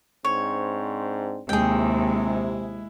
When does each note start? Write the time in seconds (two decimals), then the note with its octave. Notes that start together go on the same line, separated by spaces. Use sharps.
0.24 G#2 C4 D4 C#5
1.49 D#2 C3 G#3 E4 G#4 G5